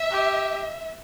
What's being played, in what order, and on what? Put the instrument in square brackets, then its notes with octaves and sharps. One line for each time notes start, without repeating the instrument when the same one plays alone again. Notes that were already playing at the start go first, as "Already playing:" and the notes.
Already playing: [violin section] E5
[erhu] G4